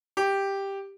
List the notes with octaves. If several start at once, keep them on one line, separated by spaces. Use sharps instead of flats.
G4